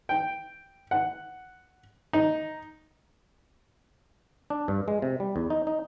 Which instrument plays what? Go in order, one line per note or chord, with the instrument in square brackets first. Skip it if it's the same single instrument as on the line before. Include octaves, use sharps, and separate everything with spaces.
[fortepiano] G5
F#5
D#4
[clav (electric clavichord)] D4
G2
G#3
C3
G3
E2
D#4
D#4